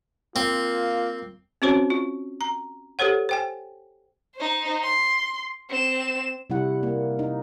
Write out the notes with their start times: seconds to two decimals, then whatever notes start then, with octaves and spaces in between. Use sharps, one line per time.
0.36 A#3 C4 F4
1.62 C4 C#4 F#4 C5 C#5
1.90 F4
2.41 A#5
2.99 G4 A4 C5 C#5 F#5
3.29 C5 G5 G#5
4.36 D#4 C5
4.84 C6
5.70 C4 E7
6.50 C3 G3 E4 F#5
6.83 A#3
7.19 D#4